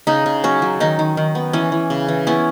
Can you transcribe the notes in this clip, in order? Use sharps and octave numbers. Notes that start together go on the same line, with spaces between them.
C#3 D#4
C#3
F#3 C#4
F#3
D#3 D#4
D#3
D#3
B3
E3 C#4
E3
C#3
E3
B3 C#4 E4